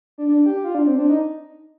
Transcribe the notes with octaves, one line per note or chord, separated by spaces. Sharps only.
D4
D4
G4
F4
D4
C4
D4
D#4